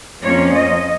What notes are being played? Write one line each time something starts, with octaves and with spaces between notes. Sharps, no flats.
F2 F3 A#3 C#4 C#5
D#5